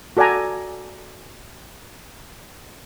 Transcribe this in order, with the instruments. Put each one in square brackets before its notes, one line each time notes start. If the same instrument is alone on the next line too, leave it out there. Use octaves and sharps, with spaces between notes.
[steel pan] F#4 A4 D5 F#5 G#5 A#5